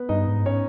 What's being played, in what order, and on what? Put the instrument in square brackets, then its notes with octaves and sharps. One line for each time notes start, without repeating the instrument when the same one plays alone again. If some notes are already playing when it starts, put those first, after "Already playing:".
Already playing: [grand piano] B3 B4
[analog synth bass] G2 [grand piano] D#4 D#5
[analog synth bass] G#2
[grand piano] C#4 C#5